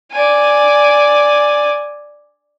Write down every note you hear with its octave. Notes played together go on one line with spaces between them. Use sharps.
D5 G#5